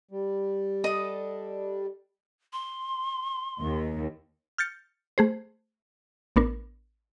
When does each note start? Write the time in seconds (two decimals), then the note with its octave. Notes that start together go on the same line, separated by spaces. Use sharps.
0.11 G3
0.84 D4 A4 D#5 D#6
2.53 C6
3.61 D#2
4.58 F6 G6 A6 C#7
5.18 A3 G#4 C5
6.36 A1 B3 D4 A#4